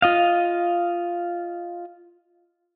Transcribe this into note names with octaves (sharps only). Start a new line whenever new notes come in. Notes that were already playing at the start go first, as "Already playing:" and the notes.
F4 D#5 F5